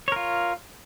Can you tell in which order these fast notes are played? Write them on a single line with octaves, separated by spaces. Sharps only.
C#5 A#4 F4